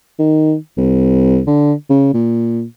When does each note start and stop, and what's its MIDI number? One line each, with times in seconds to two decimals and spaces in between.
0.19 0.55 51
0.77 1.41 36
1.47 1.73 50
1.90 2.10 49
2.14 2.64 46